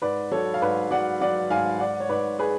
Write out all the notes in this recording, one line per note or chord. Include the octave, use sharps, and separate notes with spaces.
G#2 B4 D5
F#3 A4 C#5
F5
G#2 B4 D5
F#3 D5 F#5
F#3 D5 F#5
G#2 F5 G#5
G#2 D5 F#5
C#5
G#2 B4 D5
G#4 B4